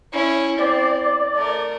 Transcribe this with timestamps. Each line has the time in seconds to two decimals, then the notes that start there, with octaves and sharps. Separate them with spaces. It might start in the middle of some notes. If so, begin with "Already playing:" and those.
0.13 C#4 E4
0.59 C4 D5
1.35 A3 A#4